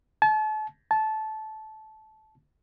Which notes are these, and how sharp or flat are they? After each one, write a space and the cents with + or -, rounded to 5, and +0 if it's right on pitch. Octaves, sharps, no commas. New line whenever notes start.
A5 -35
A5 -15